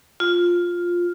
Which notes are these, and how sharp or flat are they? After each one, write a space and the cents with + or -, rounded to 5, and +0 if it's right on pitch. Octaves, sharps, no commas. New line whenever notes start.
F4 +5